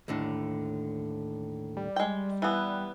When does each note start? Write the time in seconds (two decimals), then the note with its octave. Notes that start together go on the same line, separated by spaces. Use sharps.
0.08 D#2 A2 D3
1.77 G3
1.96 G#3 G5
2.42 E3 B3